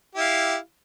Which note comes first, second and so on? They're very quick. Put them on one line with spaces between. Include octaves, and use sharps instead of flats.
G4 E4 F5